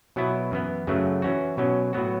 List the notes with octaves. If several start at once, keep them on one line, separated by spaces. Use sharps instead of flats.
B2 F#3 B3 E4
F#2 E3 B3
F#2 C#3 F#3 A3
E3 C#4 F#4
B2 F#3 C#4
A2 F#3 B3 F#4